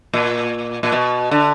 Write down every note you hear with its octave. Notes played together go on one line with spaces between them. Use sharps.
A#2
A#2
B2
D3